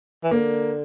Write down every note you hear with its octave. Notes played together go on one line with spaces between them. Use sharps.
E3
D3 A#3